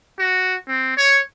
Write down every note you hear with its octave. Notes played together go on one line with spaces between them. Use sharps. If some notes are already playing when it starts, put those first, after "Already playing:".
F#4
C4
C#5